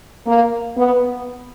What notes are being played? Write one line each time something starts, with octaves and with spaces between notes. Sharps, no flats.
A#3
B3